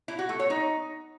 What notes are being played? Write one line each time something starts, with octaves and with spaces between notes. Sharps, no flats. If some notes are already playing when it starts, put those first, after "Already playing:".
E4
F#4
A3
C#5
D#4